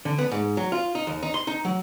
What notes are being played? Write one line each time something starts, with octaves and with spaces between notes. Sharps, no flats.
D3
B3
G#2
F#3
F4
D#4
D#2
D#4
C6
D#4
F#3